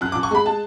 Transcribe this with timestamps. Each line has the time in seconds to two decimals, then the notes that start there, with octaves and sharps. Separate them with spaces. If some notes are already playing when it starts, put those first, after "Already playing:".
0.01 F#2 F#6
0.12 D6
0.15 F#2
0.23 C#6
0.31 G#3 B5
0.46 G#3 A5